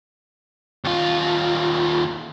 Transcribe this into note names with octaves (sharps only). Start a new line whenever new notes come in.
D#2 F4